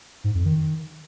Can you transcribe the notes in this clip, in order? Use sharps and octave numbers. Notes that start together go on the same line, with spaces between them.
G#2
F2
D#3